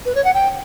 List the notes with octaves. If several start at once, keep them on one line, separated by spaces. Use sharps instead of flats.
B4
C#5
F#5
G5